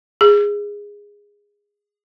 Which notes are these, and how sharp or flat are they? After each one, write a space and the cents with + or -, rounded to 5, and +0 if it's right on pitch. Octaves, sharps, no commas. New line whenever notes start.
G#4 -15